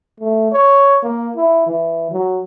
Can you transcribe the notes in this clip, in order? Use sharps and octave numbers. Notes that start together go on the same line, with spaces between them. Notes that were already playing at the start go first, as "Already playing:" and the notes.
A3
C#5
A#3
E4
E3
F#3